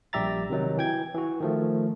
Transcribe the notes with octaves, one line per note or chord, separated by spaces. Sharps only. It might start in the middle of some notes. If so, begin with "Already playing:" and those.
A#1 G3 G4 E5 A#5 A6
C3 D#3 F#3 D#4
E3 G5 G#6
E3 F#4
D#3 F3 A3